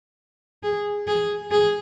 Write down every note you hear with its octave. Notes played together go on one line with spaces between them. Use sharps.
G#4
G#4
G#4